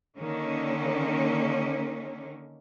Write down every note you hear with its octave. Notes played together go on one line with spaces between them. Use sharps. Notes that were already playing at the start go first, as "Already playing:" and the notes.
D3 D#3 A#3 C#4